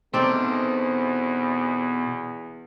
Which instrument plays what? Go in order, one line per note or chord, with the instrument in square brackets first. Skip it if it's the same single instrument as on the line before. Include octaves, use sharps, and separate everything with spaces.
[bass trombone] E2 [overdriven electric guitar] B2 [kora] C4 D5 [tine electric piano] D#4 A4 C5